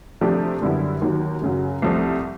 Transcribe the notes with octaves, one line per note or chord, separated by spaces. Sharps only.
C3 F3 A3 D4 G4
F#2 D3 G3 B3 E4
D#2 D#3 F#3
F#2 C#3 F#3
C2 C3 F3 A3 C4